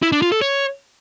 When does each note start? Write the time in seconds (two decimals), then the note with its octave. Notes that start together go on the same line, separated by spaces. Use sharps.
0.03 E4
0.12 D4
0.22 F4
0.32 A4
0.41 C#5